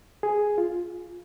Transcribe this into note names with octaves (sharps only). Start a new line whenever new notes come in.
G#4
F4